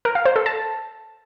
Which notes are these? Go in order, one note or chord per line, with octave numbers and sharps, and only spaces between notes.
A#4
F5
C5
A4
A5